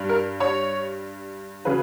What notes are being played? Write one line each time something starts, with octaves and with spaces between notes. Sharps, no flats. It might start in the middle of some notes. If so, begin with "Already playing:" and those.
Already playing: G2 G3
A#4
C#5
C#3 F#3 B4